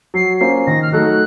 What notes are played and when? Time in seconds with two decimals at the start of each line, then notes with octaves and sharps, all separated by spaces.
0.14 F#3 C7
0.40 A#3 C#4 F4 C5 C7
0.66 D#3 A#6
0.82 F6
0.92 F#3 A3 D#4 A4 F#6